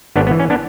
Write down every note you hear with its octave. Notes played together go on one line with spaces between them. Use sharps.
G#1 B3 D4
B3
E3
C#4
B3 D4